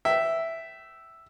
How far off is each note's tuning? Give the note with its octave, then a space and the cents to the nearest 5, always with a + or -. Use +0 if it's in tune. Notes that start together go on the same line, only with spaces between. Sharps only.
E5 +0 G5 -25